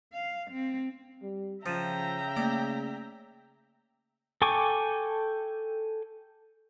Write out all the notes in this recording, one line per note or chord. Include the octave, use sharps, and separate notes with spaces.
F5
C4
G3
C#3 F3 E5 G5 A#5 A6 D#7 E7
A3 A#3 D5
A4 G5 G#5 C#6 D6